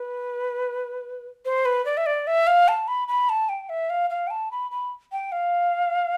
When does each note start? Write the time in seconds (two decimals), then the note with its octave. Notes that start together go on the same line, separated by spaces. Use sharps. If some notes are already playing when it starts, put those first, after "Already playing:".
Already playing: B4
1.45 C5
1.65 B4
1.86 D5
1.97 E5
2.06 D5
2.27 E5
2.47 F5
2.68 A5
2.88 B5
3.08 B5
3.29 A5
3.49 G5
3.69 E5
3.90 F5
4.10 F5
4.27 G5
4.31 A5
4.51 B5
4.71 B5
5.12 G5
5.32 F5